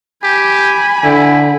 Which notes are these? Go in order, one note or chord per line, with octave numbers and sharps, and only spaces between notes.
G4 G#5 B5
D3 E4